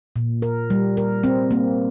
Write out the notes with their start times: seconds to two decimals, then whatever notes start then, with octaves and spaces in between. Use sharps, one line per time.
0.16 A#2
0.42 A#4
0.70 G3
0.97 A#4
1.24 C4
1.51 A#3